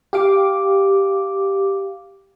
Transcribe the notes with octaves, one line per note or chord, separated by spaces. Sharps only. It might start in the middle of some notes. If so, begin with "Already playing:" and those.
G4 F5 D6